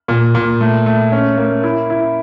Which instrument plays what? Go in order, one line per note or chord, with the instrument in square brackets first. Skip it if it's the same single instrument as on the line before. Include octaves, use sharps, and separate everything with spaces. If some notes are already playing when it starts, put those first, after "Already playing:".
[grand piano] A#2
A#2
A3
A3
C#4
A#3
E4
E4